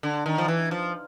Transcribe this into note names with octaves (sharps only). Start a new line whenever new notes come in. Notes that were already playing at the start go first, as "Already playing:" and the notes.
D3
D#3
F3
E3
F3